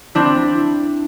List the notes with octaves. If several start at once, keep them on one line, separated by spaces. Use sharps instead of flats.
C4 D4 E4